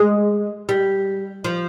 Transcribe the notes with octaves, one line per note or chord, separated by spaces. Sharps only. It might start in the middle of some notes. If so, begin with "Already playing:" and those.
Already playing: G#3
G3
F3